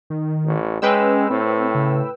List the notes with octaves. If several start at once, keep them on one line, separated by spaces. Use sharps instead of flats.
D#3
A1
G#3 C#4 B4 G5 E6
A2 C4
C#3